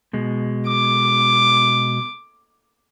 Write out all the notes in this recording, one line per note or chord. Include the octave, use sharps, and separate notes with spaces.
B2 G#3
D6